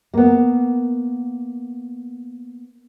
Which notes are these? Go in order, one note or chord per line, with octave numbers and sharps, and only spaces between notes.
A#3 B3